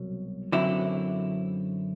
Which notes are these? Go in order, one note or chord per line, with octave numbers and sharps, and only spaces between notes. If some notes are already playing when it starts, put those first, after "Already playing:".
Already playing: C2 B2 F#3
F#2 D3 F#3 C4 E4